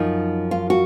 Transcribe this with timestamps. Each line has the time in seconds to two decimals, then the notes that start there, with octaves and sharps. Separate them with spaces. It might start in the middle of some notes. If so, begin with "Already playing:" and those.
Already playing: F#2 F3 D#4
0.51 F4
0.70 F#4